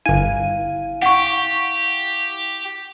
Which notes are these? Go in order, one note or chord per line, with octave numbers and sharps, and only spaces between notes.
G1 E4 F5 G#5 D#7
G4 F#5 C#6